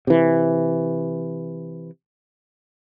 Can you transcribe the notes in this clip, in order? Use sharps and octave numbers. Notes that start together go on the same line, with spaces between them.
C3 E3